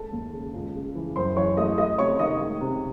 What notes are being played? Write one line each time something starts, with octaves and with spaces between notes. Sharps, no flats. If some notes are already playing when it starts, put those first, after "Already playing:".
Already playing: G#3 A4 A5
D#2
C#3
C#2
C#3
E3
F#2 C5 C6
E3 C#5 C#6
A3 D#5 D#6
A3 D#5 D#6
C3 C#5 C#6
D#3 D#5 D#6
G#3
C3